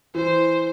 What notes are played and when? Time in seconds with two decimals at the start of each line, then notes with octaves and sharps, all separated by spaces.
0.15 E3 C5